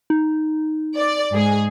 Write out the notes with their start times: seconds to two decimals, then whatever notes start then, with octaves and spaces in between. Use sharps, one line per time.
0.10 D#4
0.96 D5
1.33 G#2 G#4